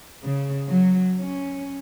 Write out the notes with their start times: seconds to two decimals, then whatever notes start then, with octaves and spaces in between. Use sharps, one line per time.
0.25 C#3
0.69 F#3
1.20 C#4